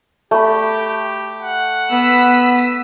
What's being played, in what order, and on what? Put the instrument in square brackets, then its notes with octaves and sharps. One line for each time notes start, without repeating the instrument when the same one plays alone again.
[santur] A3 B5 [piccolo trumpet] G4
[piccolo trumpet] F#5
[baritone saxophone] B3 [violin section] E6 B6